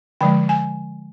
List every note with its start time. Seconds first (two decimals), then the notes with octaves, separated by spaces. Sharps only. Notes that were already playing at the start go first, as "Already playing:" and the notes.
0.21 D3 F3 G#3 G5
0.49 G#5